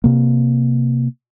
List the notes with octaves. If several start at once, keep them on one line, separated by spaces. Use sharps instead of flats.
C3 A#3